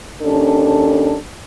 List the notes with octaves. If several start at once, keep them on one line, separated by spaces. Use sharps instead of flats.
D#2 C#4 D4 A4